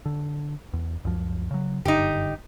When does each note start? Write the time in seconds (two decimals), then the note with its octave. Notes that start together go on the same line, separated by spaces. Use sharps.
0.06 D3
0.73 E2
1.05 C#2 F#2 F3
1.51 C#3 F#3
1.85 F#1 G2 D3 D#4 G4